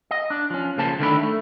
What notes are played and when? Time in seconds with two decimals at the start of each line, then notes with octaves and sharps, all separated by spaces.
0.11 D#5
0.30 D4
0.50 F3 C#4
0.78 C#3 F3 A#3 C5 A5
0.99 D3 D#3 A3 B3 D4 E4
1.23 A3